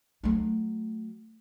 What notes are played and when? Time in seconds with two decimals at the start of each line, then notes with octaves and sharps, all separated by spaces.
0.24 F#3 A3